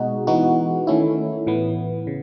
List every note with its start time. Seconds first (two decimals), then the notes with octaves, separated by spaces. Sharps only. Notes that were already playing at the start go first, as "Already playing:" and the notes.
Already playing: B2 G#3 D#4 F#4
0.27 E3 G#3 B3 D#4 F#4
0.87 D#3 A3 C#4 E4
1.47 A2 E3 B3
2.07 C#3